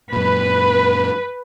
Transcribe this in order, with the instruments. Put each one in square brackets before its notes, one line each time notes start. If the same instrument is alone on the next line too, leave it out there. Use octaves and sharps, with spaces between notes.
[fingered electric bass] F#2 A#2 [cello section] B4